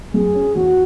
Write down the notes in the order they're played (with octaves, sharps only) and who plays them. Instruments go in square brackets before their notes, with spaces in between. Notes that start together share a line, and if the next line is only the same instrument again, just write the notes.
[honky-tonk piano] F#2 [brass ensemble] G#4
[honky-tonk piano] C#4
[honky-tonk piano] E2 [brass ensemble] F#4